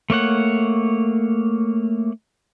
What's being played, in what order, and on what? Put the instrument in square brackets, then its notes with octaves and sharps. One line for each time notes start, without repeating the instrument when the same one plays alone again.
[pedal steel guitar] A3 A#3 C#5 F#5